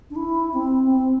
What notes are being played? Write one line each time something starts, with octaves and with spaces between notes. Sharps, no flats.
D4
E4
C4
C4